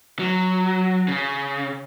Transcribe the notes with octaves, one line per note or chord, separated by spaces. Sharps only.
F#3
C#3